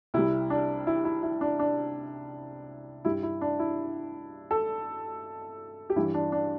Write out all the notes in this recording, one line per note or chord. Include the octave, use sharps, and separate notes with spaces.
C2 C3 G3 E4
D4
E4
E4
E4
D4
D4
G2 G3 E4
E4
D4
E4
A4
G4
G2 E3 G3 E4
D4
D4